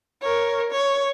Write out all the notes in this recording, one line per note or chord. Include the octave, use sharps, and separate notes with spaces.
A#4 C#5
C#5